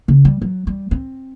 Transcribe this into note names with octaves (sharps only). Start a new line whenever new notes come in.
C#3
G3
F#3
G3
C4